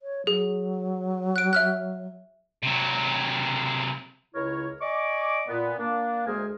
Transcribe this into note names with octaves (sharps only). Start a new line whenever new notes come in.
C#5
F#3 G#4
F#6 D7
E5 F6 F#6
C3 F#3
C#2 C#3 E4 A#4 C#5
D5 D#5 G#5 C#6 D6
A#2 B3
A#3 D4
D2 G#3 G#4 A#4 C5 G#5